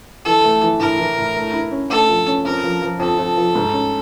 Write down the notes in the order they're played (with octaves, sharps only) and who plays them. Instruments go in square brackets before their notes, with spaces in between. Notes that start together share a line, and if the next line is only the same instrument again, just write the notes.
[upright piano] E3 [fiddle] A4
[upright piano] A3
E3
[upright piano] A2 [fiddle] A#4
[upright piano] E3
A2
A3
E4
C#4
[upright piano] A3 [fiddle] A4
[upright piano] F3
C#4
[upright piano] F2 [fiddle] A#4
[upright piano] F3
F3
[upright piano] F2 [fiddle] A4
[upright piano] F2
F3
G#2
C#4